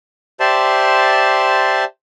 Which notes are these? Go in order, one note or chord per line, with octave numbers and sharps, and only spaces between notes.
G4 C5 D5 E5 A5 C6